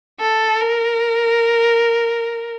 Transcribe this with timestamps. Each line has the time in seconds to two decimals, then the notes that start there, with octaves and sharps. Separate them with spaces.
0.20 A4
0.61 A#4